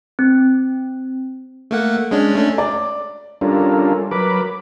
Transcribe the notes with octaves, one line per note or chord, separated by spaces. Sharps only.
C4
A3 A#3 F#5
G#3 C#4 D4
A3 C#4 D4
D5
G3 C#4 D4 F4 A4 A#4
F#3 A#4 B4 B5 D6